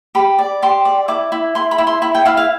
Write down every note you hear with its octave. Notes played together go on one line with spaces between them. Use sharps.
G4 B5
D5
G4 C6
D5
E4 D6
E4
E4 C6
B5
E4
C6
E4 B5
G5
E4 F5
F5